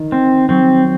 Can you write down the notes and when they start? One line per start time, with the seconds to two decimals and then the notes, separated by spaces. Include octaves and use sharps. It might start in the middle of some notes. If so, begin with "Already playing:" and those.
Already playing: D#3
0.12 C4
0.49 F#3 C4